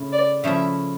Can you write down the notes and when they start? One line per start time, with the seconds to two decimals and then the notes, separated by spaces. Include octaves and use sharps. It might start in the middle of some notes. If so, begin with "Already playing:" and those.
Already playing: C#3 A3 E4
0.13 D5
0.43 C#3 F3 A3 E4 E5